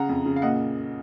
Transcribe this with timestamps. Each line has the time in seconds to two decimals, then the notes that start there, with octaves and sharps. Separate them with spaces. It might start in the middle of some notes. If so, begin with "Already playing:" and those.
Already playing: C#3 F#5 A#5
0.09 F2
0.26 C#3
0.36 F5
0.42 A#2 D#5 F#5